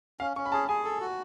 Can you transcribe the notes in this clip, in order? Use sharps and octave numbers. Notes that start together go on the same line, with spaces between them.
C#4 F5
C#4 C#6
B5
G#4 A5
G#4 G#5
A4
F#4